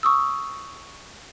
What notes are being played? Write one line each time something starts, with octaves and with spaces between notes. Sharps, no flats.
C#6 D#6 E6